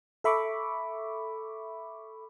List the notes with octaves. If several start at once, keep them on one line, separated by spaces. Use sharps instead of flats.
A4 E5 B5 C#6 D6